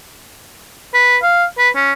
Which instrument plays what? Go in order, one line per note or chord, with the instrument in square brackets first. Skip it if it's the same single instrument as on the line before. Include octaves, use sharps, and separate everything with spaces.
[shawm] B4
F5
B4
C#4